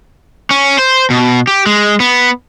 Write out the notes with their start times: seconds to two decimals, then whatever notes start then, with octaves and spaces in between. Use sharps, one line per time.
0.51 C#4
0.78 C5
1.10 B2
1.47 G4
1.66 G#3
2.00 B3